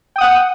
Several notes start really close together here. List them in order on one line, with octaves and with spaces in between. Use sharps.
G5 D#6 F#5